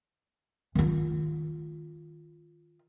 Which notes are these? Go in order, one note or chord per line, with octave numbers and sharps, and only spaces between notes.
D#3 F4